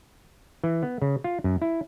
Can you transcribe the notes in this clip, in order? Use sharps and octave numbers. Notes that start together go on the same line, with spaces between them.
E3
B3
C#3
F4
F#2
E4